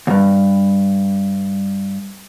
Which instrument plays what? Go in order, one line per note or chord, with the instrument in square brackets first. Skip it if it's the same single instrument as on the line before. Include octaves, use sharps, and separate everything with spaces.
[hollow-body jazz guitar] D2 G2